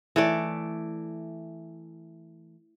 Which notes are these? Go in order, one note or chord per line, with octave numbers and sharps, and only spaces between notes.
E3 A3 D5